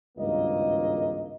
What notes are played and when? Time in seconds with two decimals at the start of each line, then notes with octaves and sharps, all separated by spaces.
0.17 G#1 C#2 G2 A#3 A#4 D#5